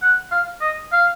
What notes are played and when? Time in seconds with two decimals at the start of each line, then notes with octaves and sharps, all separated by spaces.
0.02 F#5
0.32 F5
0.61 D#5
0.92 F5